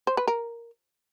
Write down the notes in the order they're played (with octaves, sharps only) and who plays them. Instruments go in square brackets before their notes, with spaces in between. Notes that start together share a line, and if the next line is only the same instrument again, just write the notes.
[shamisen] C5
B4
A#4